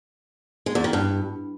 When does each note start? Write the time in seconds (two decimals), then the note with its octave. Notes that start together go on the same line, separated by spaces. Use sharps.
0.66 G#3
0.75 E2
0.84 D#3
0.93 G2